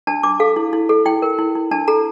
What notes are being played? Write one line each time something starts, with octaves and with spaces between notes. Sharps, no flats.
D4 A5
D4 D6
A4 F5
E4
E4
A4
E4 G5
A#4
E4
E4
D4 A5
A4 A#5